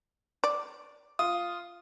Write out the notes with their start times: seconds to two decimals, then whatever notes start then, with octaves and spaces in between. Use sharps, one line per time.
0.44 D5
1.19 F4 D#6